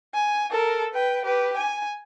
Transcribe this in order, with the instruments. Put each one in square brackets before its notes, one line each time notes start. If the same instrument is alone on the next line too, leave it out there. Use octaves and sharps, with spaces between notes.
[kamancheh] G#5
A4 A#4
B4 G5
G4 B4
G#5